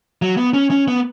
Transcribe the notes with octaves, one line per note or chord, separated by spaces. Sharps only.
F#3
B3
C#4
C#4
B3